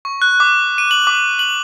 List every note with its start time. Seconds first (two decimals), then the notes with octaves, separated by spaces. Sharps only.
0.05 C#6
0.22 F#6
0.40 D6
0.78 D#7
0.91 F#7
1.07 D6
1.39 F#7